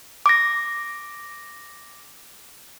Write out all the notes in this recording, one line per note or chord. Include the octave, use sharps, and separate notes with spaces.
D6 A#6